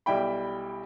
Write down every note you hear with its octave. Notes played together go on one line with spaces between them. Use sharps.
B1 G3 E4 G5 B5